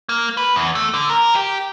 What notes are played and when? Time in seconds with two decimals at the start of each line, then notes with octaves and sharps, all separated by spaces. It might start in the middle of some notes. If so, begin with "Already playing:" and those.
0.09 A#3
0.37 B4
0.56 E2
0.75 A3
0.94 D3
1.09 A#4
1.35 G4